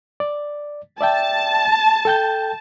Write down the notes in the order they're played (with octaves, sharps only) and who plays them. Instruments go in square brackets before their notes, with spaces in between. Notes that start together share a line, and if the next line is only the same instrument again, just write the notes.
[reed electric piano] D5
[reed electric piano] D5 E5 G5 [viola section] A5
[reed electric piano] A4 G5 G6